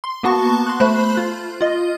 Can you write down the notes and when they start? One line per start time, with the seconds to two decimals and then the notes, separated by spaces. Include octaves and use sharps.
0.04 C6
0.23 A#3 B3 F#4 A5 C#6
0.66 C6 F#6
0.80 A3 C5 B5 F#6
1.17 F4
1.61 F4 D#5